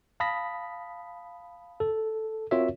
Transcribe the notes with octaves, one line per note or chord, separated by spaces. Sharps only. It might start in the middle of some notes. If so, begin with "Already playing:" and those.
F5 A5 B5 D#6 A#6 B6
A4
C4 F4 F#4 A#4 C#5 E5